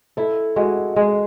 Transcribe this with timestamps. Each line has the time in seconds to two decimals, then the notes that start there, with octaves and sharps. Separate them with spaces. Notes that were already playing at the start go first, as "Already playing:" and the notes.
0.17 E4 A4
0.56 G#3 F#4
0.96 G#3 G#4